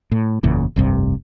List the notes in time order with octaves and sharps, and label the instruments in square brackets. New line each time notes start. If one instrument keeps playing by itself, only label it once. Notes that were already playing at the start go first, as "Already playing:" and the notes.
[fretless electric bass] A2
F#1 E2 A#2 C#3
F1 C2 G2 C3